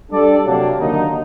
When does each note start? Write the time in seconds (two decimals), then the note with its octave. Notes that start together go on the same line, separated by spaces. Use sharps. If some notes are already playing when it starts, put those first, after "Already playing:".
0.11 G3 D4 A4 D5
0.45 C3 F#3 A#3 D4
0.77 D#2 D3 F#3 A#3 D#4